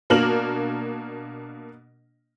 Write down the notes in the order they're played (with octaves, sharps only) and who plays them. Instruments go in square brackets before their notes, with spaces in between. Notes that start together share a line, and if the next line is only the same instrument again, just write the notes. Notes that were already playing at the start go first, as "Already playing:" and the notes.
[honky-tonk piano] B2 A#3 D4 A#4 F6 F#7